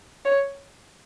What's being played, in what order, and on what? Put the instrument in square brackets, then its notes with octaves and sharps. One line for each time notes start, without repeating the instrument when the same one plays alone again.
[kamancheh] C#5